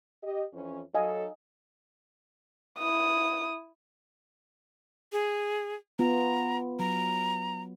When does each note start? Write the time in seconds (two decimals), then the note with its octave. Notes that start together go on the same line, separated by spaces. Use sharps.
0.24 G4 D#5
0.53 F2 E3 C#4
0.95 F#3 D#4 A4 D#5 F5 G#5
2.78 E4 D#6
5.12 G#4
5.99 B3 F4 A#5
6.79 F#3 A#5